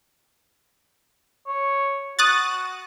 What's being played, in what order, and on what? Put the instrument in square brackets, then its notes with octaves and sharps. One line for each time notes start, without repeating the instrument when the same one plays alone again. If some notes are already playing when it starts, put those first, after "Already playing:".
[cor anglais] C#5
[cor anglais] F#4 [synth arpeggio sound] D#6 F#6 A6